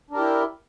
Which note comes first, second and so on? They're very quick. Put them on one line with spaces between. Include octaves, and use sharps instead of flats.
D4 A#4 G4 E4